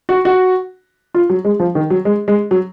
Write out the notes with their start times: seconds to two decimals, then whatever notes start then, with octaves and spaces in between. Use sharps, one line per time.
0.09 F#4
0.25 F#4
1.14 F4
1.30 F#3
1.45 G#3
1.60 F3
1.75 D#3
1.90 F#3
2.05 G#3
2.28 G#3
2.51 F#3